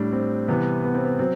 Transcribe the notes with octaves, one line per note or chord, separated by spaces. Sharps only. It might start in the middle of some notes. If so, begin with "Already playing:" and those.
Already playing: A2 G3 D4
C4
C3 E3 G3 B3
B3
C4
B3
F#3 C4